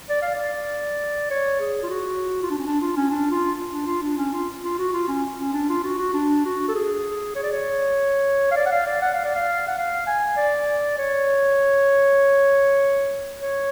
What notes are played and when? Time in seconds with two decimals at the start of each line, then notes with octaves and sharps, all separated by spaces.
0.09 D5
0.22 F5
0.35 D5
1.30 C#5
1.60 G#4
1.83 F4
1.90 F#4
2.43 F4
2.50 D4
2.58 C#4
2.66 D4
2.81 F4
2.97 C#4
3.11 D4
3.31 F4
3.72 D4
3.87 F4
4.02 D4
4.17 C#4
4.32 F4
4.62 F4
4.78 F#4
4.93 F4
5.08 C#4
5.38 C#4
5.53 D4
5.69 F4
5.84 F#4
5.99 F#4
6.14 D4
6.45 F#4
6.68 A4
6.75 G#4
7.35 C#5
7.43 D5
7.52 C#5
8.51 F5
8.56 D5
8.66 F#5
8.71 F5
8.86 D5
9.02 F#5
9.13 F5
9.24 D5
9.36 F5
9.67 F#5
9.77 F5
10.07 G#5
10.37 D5
10.98 C#5
13.40 C#5